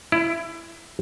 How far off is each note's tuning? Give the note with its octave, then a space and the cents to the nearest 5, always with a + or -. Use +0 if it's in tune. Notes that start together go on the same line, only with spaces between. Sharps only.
E4 +20